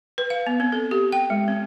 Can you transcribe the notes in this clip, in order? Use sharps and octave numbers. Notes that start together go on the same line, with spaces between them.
B4
F5
B3
C4
A4
G4
G5
G#3
C4